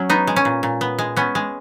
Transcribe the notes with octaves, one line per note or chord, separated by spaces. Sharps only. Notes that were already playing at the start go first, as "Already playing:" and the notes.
Already playing: F#3 C#4
B3 D#4
G#3
C#4
A#2
A#2
B3
G#3
B3 C#4
G#3